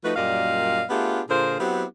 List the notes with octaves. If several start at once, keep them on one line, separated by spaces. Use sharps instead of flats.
F3 A3 D#4 F#4 B4
F#2 A#2 G3 D5 D#5 F5
A3 B3 D4 F4 G4 G#4
A#2 D3 F4 G#4 A#4 C5
F#3 B3 C4 E4 G4